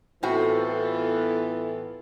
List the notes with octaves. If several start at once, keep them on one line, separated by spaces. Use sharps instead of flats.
A2 E3 B3 C4 F4 F#4 A4